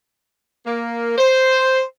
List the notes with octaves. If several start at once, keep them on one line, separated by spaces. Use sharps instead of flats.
A#3
C5